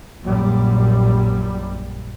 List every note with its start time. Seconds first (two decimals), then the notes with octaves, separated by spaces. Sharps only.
0.23 A#1 F#2 G3